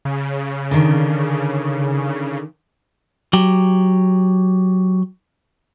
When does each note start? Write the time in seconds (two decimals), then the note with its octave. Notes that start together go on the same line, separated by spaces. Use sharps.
0.05 C#3
0.71 D3 D#3
3.33 F#3 G4